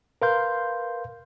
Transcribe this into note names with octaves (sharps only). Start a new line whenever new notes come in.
A#4 B4 F5 C6 G6